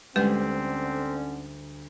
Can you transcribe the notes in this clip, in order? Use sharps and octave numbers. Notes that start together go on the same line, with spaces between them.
D2 D3 G3 G#3 C4 C#4 B4